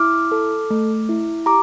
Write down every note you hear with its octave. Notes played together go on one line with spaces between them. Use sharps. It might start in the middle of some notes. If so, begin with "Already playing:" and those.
Already playing: E4 D6 F6
A4
A3
E4
G4 A#5 D6